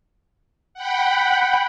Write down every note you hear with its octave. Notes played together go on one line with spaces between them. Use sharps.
F#5 G5 B5